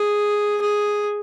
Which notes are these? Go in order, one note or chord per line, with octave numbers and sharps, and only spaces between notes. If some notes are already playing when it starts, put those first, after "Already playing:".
Already playing: G#4
G#4